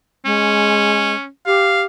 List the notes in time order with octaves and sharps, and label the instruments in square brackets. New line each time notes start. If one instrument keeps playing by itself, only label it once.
[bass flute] G#3 [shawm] C#4
[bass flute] G4 [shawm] F5